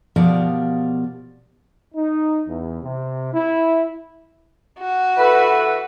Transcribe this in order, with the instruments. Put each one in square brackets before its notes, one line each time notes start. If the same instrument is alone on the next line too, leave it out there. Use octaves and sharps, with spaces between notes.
[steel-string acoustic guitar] B2 F3 G4 A#4 D5 F5
[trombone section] D#4
E2
C3
E4
[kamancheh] F#4
[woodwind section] E3 A4 B4